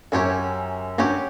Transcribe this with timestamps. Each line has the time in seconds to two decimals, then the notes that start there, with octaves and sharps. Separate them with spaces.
0.12 F#2 F#3 C#4 G4 C#5
0.98 G2 F#3 C#4 G4 C#5